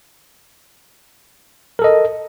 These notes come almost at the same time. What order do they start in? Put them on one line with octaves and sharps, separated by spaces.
A#4 A4 D#5